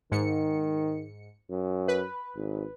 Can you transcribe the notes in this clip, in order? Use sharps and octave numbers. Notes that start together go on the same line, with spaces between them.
G#2 D#3 C#7
F#2
B4
G#1